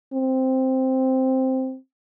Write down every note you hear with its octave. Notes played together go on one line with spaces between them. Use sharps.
C4